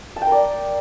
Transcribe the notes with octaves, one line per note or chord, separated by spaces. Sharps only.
A5
G5
A#4
D5